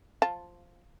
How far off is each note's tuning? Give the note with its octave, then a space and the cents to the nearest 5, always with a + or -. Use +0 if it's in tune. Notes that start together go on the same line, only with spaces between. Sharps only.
F3 +0 F4 +0 A5 +0